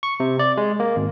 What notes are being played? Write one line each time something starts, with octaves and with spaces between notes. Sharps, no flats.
C#6
C3
D5
G#3
A#3
G#1